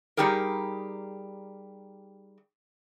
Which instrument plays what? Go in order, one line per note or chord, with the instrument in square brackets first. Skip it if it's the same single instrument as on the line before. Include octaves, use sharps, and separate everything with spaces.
[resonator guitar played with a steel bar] G3 D#4 G4 G#4 A#4